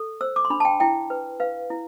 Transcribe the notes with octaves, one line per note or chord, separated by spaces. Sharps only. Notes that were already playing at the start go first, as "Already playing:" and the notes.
Already playing: A4
C5 E6
D6
C6
D4 B5
A5
G5
E4 G5
B4
B4 F5
E4